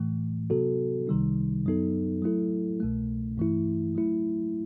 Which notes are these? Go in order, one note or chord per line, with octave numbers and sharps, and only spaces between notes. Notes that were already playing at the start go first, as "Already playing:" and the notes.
Already playing: A2 E3 A3
C3 F#3 B3 F#4 A4
C2 C3 D#3 G3 D#4
F#2 F#3 B3 D#4 A4
F#3 A3 E4 A4
C2 B2 A3
G2 E3 A3 E4
F#3 A3 E4